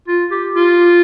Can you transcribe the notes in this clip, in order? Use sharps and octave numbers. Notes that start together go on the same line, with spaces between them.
F4
G4
F4